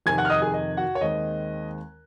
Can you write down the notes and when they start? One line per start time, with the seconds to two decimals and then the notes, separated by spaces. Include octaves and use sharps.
0.06 F2 C3 D#3 G#5 G#6
0.18 F#5 F#6
0.25 F6
0.30 D#5 D#6
0.42 G#4 G#5
0.54 D#5
0.77 F#4 F#5
0.95 C#5
1.01 D#2 D#3 G#3 C4 D#5